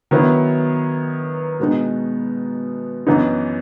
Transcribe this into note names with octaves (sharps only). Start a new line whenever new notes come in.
D#3 F#3 B3 E4
B2 G#3 B3 D#4
F#2 E3 B3 D#4